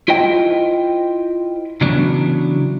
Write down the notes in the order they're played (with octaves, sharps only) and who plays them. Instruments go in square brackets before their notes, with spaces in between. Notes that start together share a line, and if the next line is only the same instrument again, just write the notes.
[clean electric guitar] E4 F4 C5 D#5 G5
C#3 E3 F#3 B3 D4